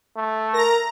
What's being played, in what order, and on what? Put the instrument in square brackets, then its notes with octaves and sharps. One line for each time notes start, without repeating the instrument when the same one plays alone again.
[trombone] A3
[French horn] A#4 [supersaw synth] A#5 A#6